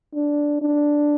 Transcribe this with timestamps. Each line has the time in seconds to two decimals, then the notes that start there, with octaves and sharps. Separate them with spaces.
0.15 D4
0.61 D4